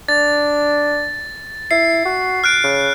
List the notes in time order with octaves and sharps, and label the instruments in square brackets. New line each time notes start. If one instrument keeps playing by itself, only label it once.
[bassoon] D4 [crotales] A6
[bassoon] E4 [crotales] C7
[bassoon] F#4
[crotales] F6 F#6 D7
[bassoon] C#3